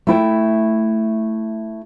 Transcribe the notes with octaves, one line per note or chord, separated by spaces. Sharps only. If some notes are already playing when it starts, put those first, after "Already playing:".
A3 E4 G5